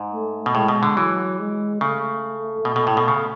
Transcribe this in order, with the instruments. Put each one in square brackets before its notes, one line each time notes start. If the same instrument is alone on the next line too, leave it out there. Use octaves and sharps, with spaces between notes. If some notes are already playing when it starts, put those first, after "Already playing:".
Already playing: [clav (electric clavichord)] G#2
[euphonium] A3
[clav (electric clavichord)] B2
[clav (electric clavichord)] A2 [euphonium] G#3
[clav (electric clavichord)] B2
D3
[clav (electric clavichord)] E3 [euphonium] F#3
[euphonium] G#3
[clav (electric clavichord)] C#3 [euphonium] A3
[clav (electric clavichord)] B2
B2
A2
B2
C#3